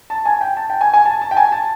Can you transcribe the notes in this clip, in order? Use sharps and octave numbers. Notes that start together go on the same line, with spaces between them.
A5
G#5
G5
A5
G5
G#5
G#5
A5
A5
G5
G#5
A5